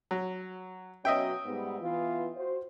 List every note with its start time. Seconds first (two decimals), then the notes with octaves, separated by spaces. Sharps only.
0.11 F#3
1.05 B2 F#3 C#4 D#5 E5 G5
1.45 G#2 G3 B3
1.81 E3 B3 F4
2.36 F#4 C5